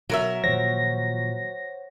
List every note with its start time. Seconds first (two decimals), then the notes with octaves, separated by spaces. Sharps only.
0.09 B2 F#3 A#4 E5
0.44 A#2 D#3 F3 C5 C#5 F#5 A#6